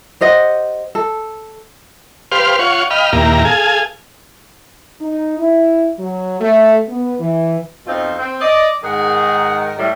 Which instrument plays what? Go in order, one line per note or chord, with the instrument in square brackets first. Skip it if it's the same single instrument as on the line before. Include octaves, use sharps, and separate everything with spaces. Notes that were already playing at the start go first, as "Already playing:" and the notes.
[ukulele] G4 C5 D#5 F#5
A4
[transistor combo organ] G4 B4 C5 F5 C6 F6
F4 C#5 F5 F#5 C#6
D#5 F5 G5 B5 F6
D#2 A#2 A#3 E4 G4 A#5
G#4 A4 F5 G#5
[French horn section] D#4
E4
F#3
A3
B3
E3
[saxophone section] F2 B2 F3 C4 D#4 F4
C4
D5 D#5
G#2 D#3 G#4 A#4 F#5
A2 G3